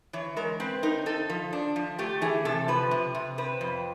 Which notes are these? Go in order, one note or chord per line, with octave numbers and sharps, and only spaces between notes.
E3 C#5
G#3 A#4
C4 B4
D#4 A#4
D#4 A4
F3
D4
F3
A3 G4
E3 G#4
C3 A4
F3 B4
C3
C3
C4 B4
F2